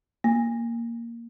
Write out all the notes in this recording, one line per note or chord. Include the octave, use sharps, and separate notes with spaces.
A#3